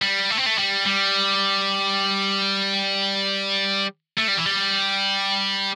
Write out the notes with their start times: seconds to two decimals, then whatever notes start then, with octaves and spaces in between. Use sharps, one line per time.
0.02 G3
0.30 A3
0.37 C4
0.46 A3
0.58 G3
0.86 G3
4.18 A3
4.28 G3
4.37 E3
4.46 G3